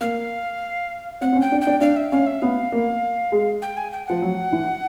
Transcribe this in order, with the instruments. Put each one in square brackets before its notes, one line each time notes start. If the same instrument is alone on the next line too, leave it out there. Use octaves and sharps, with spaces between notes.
[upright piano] A#3 [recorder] F5
[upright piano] C4 [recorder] F#5
[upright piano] C4
C#4
[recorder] G5
[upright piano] D4
[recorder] G5
[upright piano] D4
[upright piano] D4 [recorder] F5
[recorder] E5
[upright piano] C#4 [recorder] F5
[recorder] E5
[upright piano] B3 [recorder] F5
[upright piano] A#3
G#3
[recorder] G5
G#5
G5
[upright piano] F3 [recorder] F#5
[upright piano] F#3
E3